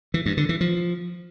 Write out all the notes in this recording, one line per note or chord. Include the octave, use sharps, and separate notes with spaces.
E3
G2
D3
E3
F3